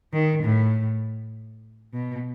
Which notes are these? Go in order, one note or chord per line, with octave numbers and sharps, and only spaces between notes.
D#3
A2
B2